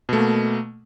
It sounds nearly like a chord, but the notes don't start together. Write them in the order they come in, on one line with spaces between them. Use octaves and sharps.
B2 A3 A#3